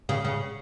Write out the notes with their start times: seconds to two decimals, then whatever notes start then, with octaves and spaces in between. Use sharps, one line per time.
0.09 C#3
0.25 C#3